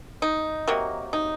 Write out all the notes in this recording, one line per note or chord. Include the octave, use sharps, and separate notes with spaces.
D#4
C3 F#3 A#3
D#4